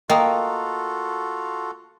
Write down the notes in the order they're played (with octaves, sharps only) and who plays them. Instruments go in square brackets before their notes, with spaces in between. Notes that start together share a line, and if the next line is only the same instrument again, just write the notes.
[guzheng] A#3 [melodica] F4 F#4 A4 [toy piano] D#5 G5 D#6